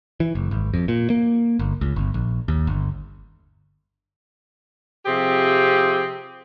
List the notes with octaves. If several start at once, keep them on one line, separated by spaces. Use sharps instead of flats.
E3
F#1
G#1
F2
A#2
A#3
G1
C#2
G1
A#1
D#2
G1
C3 F3 C4 G4 G#4